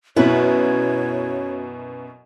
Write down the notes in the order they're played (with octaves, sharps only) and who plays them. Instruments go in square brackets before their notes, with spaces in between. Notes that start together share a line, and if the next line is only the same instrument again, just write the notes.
[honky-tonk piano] F#2 B2 [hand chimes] C#4 F#4 [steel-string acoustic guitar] E4 B4 [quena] C#5